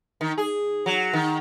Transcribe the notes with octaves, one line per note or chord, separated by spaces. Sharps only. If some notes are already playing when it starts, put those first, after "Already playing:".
D#3
G#4
F#3
D#3